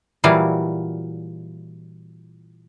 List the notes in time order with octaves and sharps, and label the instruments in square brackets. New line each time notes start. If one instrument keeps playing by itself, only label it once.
[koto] A#2 E3 F#3 G3 F5